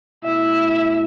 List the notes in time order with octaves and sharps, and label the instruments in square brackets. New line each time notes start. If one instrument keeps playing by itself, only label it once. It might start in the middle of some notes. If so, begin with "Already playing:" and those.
[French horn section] B2 A3 E4 [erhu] E5